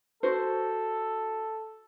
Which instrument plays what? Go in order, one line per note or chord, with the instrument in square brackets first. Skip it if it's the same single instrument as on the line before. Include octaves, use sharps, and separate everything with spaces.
[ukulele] F#4 C5 [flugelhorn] A4